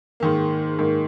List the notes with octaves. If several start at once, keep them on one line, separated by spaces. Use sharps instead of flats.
G#2 D#3 A#3
G#2 D#3 A#3